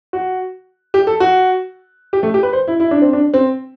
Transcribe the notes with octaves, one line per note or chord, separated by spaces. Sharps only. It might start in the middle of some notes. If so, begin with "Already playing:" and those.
F#4
G4
A4
F#4
G4
A3
G4
B4
C5
E4
E4
D4
C4
D4
C4